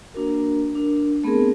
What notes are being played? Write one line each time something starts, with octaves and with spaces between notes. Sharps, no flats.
A#3 D4 F#4 A#4
D4 A#4
A3 B3 C4 G#4 A#4